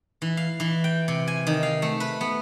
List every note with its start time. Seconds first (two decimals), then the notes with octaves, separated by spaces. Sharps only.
0.22 E3
0.37 F5
0.60 E3
0.84 G5
1.08 C3
1.28 G#5
1.47 D#3
1.63 F5
1.82 A3
2.00 B4
2.21 B3